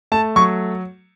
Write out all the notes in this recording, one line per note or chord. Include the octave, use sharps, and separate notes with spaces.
A3 A5
F#3 C#6